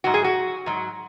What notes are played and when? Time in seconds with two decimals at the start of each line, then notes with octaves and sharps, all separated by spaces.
0.04 G#2 F#3 F#4
0.14 G#4
0.24 F#4
0.66 G#2 F#3